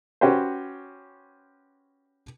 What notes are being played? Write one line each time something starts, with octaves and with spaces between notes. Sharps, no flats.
C#4 F#4 G4 B4 C5